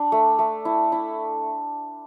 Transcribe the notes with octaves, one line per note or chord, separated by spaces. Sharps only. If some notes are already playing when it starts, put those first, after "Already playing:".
Already playing: D4
A3
A3
E4
E4